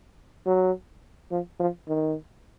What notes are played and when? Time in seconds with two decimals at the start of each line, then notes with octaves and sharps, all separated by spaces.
0.46 F#3
1.31 F3
1.60 F3
1.88 D#3